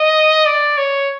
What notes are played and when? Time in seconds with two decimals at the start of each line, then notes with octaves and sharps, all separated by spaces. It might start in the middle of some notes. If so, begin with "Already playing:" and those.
Already playing: D#5
0.46 D5
0.78 C#5